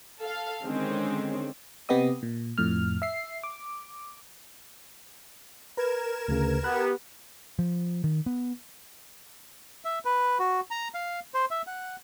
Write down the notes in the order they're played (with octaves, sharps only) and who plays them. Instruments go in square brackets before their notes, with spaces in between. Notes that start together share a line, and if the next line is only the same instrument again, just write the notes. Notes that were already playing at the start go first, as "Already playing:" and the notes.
[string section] A4 F5
D3 D#3 G#3 C4 C#4
[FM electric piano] C3 B3 G4 D#5 D#6
A#2
F2 A2 F6
E5 C7
D6
[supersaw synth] A#4 G#6 E7 [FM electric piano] B4
[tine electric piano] D2 C#3
[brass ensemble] B3 G4 [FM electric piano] B5 [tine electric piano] F#6
[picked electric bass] F3
D#3
B3
[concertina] E5
B4
F#4
A#5
F5
C5
E5
F#5